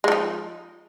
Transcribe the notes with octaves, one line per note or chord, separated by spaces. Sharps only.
F3 G#3 D#4